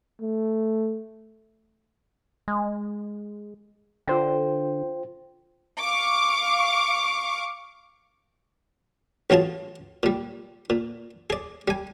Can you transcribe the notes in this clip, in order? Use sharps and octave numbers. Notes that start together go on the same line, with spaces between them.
A3
G#3
D3 F4 C5 G5
F5 C#6 D6
A1 F#3 F4 G#4 A5
A#2 G3
A#2
G#4 D5
G3 G#5